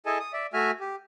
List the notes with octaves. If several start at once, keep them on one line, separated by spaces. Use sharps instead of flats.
E4 G#4 A4 D#5 G#5 A5
D#6
D5 E5
A3 F#4 E5 G#5 F6
G4